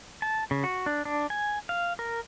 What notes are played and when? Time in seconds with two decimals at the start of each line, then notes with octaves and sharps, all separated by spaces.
0.22 A5
0.51 C#3
0.64 F#4
0.86 D4
1.05 D4
1.30 G#5
1.69 F5
1.99 A#4